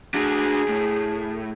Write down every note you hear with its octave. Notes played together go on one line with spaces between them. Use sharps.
D4 F#4 G#4
A2